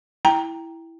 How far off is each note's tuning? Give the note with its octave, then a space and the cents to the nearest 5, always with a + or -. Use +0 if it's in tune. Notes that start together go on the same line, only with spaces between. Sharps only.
E4 +0 G5 +0 A#5 +0